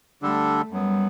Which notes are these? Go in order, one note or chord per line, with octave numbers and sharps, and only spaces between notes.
D3 G3 A3 D4 A4
F#2 F#3 G3 B3